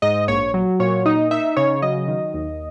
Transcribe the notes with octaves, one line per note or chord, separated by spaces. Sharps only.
G#2 D#5
A#1 C#5
F#3
A#2 C#5
D#4 D#5
D#4 E5
C#3 C#5
F#3 D#5
D#3
D#2